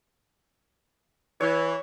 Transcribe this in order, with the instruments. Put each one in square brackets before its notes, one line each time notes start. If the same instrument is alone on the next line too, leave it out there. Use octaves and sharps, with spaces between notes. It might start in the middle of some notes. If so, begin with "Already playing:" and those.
[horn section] E3 [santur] C#5